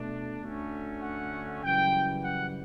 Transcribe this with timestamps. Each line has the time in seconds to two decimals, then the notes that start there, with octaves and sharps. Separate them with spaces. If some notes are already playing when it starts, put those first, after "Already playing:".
Already playing: B2 A3 D4
0.41 D2 D3 A3 C#4
1.02 F#5
1.63 F#2 C#3 E3 G3 G5
2.24 F#5